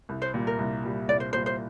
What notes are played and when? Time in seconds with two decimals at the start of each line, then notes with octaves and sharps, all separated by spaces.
0.09 C2
0.22 C5
0.34 A#2 G3
0.47 A#4
0.59 C2
0.84 A#2 G3
1.08 C2 D5
1.20 C5
1.33 A#2 G3 C5
1.46 C5